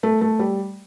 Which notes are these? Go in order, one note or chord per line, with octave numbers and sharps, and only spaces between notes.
A3
A3
G3